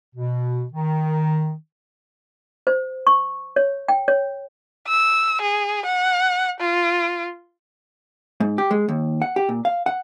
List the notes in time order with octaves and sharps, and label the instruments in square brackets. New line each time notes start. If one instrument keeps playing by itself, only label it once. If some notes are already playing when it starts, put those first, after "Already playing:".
[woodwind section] B2
D#3
[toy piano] C5
C#6
C#5
G5
C#5
[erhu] E6
G#4
F#5
F4
[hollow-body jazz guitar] G#2
G4
G#3
D#2
F#5
G4
A#2
F5
F#5